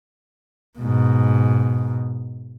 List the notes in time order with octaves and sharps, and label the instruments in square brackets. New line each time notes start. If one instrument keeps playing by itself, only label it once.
[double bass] G#2 B2